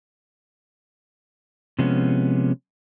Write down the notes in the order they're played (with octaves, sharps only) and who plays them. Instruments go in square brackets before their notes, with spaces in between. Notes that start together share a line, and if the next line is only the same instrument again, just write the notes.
[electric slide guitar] C3 F3 G#3 B3 C#4